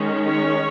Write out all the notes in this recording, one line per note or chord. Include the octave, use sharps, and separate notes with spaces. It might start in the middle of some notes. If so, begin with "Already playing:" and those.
Already playing: D#3 G#3 C#4
C#5